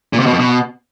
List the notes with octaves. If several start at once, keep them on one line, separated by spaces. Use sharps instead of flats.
A#2
C3
B2
F2
B2